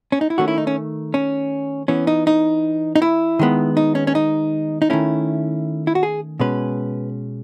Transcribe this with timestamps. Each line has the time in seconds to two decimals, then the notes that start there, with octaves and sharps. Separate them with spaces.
0.12 C#4
0.21 D#4
0.30 E4
0.38 D#3 A3 C#4 F#4
0.48 E4
0.58 D#4
0.67 C#4
1.14 C#4
1.88 E3 B3 C#4
2.07 D#4
2.27 D#4
2.96 D#4
3.02 E4
3.39 D#3 G#3 B3
3.77 D#4
3.95 C#4
4.07 C#4
4.15 D#4
4.82 D#4
4.90 D#3 A3 C#4 E4
5.87 E4
5.95 F#4
6.03 G#4
6.40 B2 G#3 C#4 B4